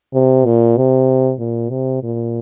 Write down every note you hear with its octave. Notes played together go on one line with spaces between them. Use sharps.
C3
A#2
C3
A#2
C3
A#2